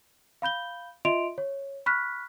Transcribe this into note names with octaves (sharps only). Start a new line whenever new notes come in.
F5 B5 G6 G7
F4 D#5 E5 C6 D7 F7
C#5
B5 C#6 F6 F#6 B6